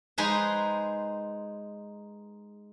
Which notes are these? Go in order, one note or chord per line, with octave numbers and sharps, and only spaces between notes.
G#3 D#4 G#4 B4 C5